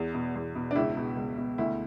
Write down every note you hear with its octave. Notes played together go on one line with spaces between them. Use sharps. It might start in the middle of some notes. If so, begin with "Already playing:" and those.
Already playing: E2
B2
E2
B2
D4
C#2 E4
B2
C#2
B2
D2 E4